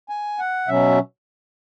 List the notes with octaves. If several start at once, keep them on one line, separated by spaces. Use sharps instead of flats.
G#5
F#5
B2 F#3 C#4 E5